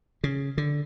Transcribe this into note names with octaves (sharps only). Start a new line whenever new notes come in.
C#3
D3